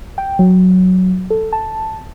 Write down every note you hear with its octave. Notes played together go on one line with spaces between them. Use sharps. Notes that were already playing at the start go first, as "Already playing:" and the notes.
G5
F#3
A4
A5